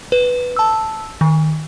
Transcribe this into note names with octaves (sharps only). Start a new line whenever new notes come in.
B4
A5 E6
D#3